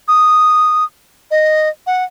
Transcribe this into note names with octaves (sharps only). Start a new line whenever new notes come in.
D#6
D#5
F#5